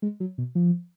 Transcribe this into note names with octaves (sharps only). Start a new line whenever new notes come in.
G#3
F#3
B2
F3